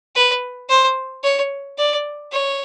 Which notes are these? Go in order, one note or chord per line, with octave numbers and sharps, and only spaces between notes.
B4
C5
C#5
D5
C#5